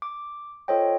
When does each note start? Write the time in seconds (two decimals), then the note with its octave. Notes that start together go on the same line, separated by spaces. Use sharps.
0.02 D6
0.68 F4 A4 C5 C#5 D#5 G5